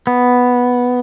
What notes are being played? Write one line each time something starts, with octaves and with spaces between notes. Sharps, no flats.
B3